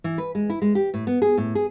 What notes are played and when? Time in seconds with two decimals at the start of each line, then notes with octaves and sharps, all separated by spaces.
0.04 E3
0.18 B4
0.35 G#3
0.50 E4
0.62 G#3
0.75 G4
0.94 A2
1.07 B3
1.22 G#4
1.37 A2
1.55 G#4